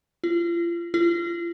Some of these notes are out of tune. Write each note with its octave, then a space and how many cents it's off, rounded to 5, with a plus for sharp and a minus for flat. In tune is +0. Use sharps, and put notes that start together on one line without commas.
F4 -35
F4 -35